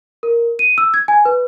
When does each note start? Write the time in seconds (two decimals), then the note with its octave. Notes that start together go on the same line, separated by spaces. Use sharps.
0.23 A#4
0.59 D#7
0.78 E6
0.94 G#6
1.08 G#5
1.25 B4